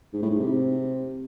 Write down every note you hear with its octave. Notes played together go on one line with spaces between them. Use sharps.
G#2
A2
G#2
C3